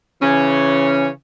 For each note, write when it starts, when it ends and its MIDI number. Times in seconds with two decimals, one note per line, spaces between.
0.22 1.09 49
0.22 1.09 52
0.22 1.09 61